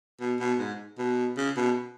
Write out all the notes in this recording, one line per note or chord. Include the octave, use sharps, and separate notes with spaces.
B2
B2
G#2
B2
C#3
B2